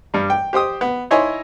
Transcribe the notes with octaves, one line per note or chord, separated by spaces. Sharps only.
G2 G3
G5
G4 C5 G5 D#6
B3
D#4 E4 C#5 D#5 G#5 C6